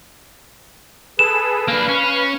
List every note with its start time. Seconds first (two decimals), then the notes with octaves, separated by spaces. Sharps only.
1.19 G#4 A4 B4 E7
1.68 A#3 D4 B4 F5
1.88 C#4